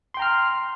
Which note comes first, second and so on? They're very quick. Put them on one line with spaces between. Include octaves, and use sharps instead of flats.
C6 G5 A#5 F6